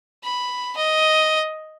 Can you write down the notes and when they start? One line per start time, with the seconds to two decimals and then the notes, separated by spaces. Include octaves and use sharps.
0.24 B5
0.77 D#5